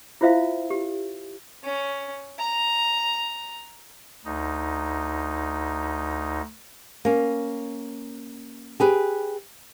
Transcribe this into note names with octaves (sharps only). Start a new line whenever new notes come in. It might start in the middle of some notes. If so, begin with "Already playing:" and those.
E4 F4 C5 E5 F5
G4
C#4
A#5
D2 D#4
A#3 C#4
G4 G#4 B4